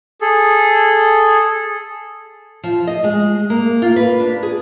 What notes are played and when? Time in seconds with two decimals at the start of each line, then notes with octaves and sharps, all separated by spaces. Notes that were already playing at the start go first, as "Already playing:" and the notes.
0.21 G#4 A4
2.64 F3
2.87 D#5
3.04 G#3
3.50 A#3
3.82 F4
3.96 B4
4.20 D4
4.43 G#4